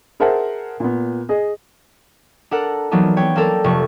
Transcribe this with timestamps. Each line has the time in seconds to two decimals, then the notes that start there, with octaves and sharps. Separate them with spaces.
0.20 G#4 A#4 C5 E5 F#5 A5
0.80 A#2 B3
1.29 G#4 D#5
2.51 D4 A4 A#4 F#5
2.91 E3 F#3 A#3 B3 D4 D#4
3.17 B3 C#5 G5
3.36 A#3 C4 D4 A4 A#4
3.64 F1 C#6